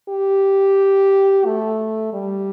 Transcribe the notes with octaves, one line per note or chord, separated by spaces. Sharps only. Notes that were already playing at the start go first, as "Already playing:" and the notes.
G4
A3
G3